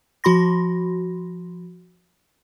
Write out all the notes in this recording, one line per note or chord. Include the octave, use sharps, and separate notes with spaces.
F3 F#4 B5 C6 A#6